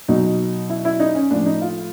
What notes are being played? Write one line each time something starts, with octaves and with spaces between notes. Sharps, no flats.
B2 F#3 D#4
E4
E4
D#4
C#4
A2 F3 D4
D#4
F4